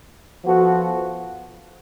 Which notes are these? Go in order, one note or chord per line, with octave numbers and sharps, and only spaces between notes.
F3 B3 F#4 A4